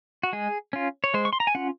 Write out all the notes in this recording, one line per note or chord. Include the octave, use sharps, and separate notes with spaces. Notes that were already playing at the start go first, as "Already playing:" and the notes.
F#4
G#3 G#4
C#4 F4
C#5
G#3 C5
C#6
C6
A#5
G#5
C#4 F4 F#5